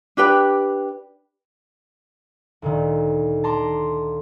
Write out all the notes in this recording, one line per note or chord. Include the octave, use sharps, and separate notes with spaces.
D4 G4 B4 G5
D2 A#2 D#3
A5 A#5 C6 D6